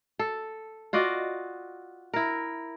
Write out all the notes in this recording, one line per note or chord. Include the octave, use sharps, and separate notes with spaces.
A4
F4 F#4 D5 D#5
E4 A#4